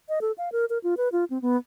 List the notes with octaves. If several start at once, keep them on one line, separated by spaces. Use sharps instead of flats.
D#5
A4
F5
A#4
A#4
F4
B4
F4
C4
B3